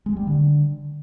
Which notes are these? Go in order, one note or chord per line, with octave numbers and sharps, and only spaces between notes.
G#3
G3
D3